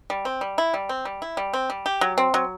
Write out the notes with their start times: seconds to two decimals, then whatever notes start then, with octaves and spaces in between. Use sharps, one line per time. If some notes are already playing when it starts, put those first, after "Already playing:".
0.10 G3
0.25 C4
0.41 G3
0.58 E4
0.74 G3
0.89 C4
1.05 G3
1.22 E4
1.37 G3
1.53 C4
1.70 G3
1.86 G4
2.01 F#3
2.18 C4
2.34 F#3